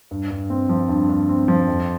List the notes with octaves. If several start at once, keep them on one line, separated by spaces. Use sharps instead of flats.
G2
G2
C4
F3
G2
G2
C4
F3
F2